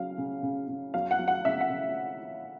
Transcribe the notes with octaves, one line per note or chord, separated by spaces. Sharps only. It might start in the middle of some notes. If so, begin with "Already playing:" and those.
Already playing: C#3 F#3 F5
C#3
C#3
C#3
F#3 F5
F#5
F#3
F#5
C#3 E5
F#5
C#3